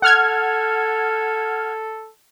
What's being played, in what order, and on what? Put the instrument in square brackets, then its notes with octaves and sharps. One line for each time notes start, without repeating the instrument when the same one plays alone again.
[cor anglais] A4 [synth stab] F#5 F6 G#6